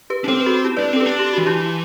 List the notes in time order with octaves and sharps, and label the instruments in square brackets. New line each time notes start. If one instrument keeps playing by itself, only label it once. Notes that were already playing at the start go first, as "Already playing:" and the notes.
[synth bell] G4 B4
[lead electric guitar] D4
[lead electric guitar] C4 [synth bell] A4 C5
[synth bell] B4
F#4 A4
E4 G4
[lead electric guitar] D4 [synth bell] B4 D5
[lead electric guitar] C4 [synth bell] A4
[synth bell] G4 B4
[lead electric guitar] D4
[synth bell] G4
[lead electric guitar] E3 [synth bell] F#4
[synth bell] E4 G4